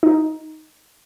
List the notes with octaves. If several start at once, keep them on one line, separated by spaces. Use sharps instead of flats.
D#4